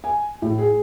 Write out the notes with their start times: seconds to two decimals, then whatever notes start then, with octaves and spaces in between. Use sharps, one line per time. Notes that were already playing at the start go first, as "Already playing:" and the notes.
0.04 G#5
0.42 A2
0.58 G#4